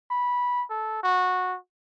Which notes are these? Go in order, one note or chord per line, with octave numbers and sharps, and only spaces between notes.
B5
A4
F#4